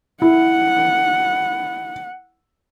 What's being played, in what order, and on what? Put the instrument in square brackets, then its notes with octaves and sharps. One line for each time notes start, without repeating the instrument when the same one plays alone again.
[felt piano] E4 [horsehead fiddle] F#5